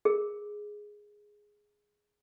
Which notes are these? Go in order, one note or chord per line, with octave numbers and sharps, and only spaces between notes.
G#4 A#4